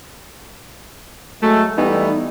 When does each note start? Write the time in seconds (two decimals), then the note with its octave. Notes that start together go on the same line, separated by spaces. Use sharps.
1.43 F#3 G#3 A3
1.76 E3 G3 A3 B3 D#4